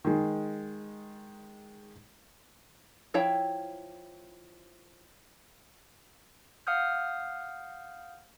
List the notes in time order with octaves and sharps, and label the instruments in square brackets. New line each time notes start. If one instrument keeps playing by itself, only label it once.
[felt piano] D#3 G#3
[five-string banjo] F3 E4 C#5 F5 G5
[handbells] F5 F#5 D#6 F6 G6